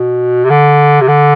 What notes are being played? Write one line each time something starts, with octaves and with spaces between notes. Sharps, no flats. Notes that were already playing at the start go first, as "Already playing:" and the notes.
Already playing: B2
C3
D3
C3
D3